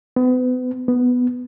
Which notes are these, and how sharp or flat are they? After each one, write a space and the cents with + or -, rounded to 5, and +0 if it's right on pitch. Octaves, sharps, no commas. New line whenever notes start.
B3 +35
B3 +5